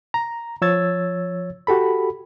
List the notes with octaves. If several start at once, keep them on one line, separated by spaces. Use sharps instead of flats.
A#5
F3 C#5 E6 G#6 A6
F#4 G4 A4 B5